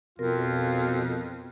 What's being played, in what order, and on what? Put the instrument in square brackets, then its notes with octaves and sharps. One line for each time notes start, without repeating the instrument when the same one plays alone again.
[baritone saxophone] F2 [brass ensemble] B2 F3 F4 [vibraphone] A#4